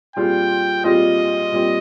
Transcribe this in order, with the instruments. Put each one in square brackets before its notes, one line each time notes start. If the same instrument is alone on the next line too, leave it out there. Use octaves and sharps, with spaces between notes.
[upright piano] A#2 G3 C4 F4 G#4 [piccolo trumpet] G5
[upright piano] A#2 G3 C4 F4 G#4 [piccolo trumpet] D#5
[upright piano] A#2 G3 C4